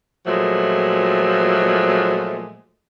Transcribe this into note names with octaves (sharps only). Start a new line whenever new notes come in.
A#2 F3 F#3 G#3 A3